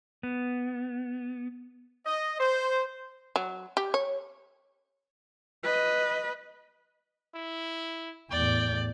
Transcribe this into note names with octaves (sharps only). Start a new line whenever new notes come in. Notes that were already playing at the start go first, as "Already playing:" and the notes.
B3
D#5
C5
F#3
G4
C#5
B4 D#5
E4
E2 A2 D5 G5